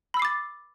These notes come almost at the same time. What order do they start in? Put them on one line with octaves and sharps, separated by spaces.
B5 E6 C7 D6 A6